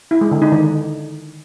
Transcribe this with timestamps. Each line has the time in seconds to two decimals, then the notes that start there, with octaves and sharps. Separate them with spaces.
0.11 E4
0.21 G#3
0.31 D3
0.42 D#4
0.52 D#3